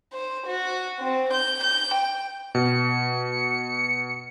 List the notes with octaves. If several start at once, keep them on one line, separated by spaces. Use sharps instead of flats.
C5
F#4
C4
G6
G6
G5
B2 C#7